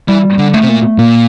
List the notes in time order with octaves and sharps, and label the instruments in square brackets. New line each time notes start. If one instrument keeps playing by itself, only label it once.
[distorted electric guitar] E3 [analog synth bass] G3
[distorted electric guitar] D3
[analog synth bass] A3
[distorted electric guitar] C3
A#2
[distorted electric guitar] A#2 [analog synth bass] A#3